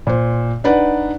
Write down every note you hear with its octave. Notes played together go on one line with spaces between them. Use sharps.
A#2 C5
D4 D#4 B4 D5 F#5